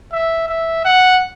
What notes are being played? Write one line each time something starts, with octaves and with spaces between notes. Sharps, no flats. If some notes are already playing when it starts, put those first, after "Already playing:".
E5
E5
F#5